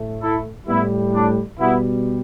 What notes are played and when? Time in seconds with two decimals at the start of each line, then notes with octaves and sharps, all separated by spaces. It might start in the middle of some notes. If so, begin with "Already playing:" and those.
Already playing: A2 A3
0.21 E4 A4
0.67 A2 G3 B3 E4
1.13 D4
1.59 B2 G3 B3 E4